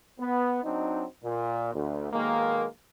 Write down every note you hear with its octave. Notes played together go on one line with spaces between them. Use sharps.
B3
F#3 C4 D4 D#4
A#2
D2
B1 D#3 G#3 A#3